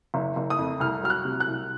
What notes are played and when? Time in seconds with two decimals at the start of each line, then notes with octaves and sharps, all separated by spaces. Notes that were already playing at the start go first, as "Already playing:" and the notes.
0.14 F#1
0.36 F#1
0.50 D#6
0.58 F2
0.80 C2 F6
1.03 F#3 F6
1.10 F#6
1.25 C3
1.40 F#6
1.47 C2